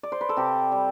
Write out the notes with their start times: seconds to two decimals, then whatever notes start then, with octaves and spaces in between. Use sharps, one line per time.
0.03 D5
0.12 C5
0.21 B4
0.29 A4
0.37 C3 G4
0.72 G3